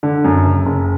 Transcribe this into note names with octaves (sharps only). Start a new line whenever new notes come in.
D3
F#2
F#1
F#1